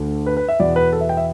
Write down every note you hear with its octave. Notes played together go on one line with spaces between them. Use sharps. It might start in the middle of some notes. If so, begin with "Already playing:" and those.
Already playing: D2 D3 A3
B4
B4
E5
E2 B2 B3 D5
B4
A4
E5
G5
E5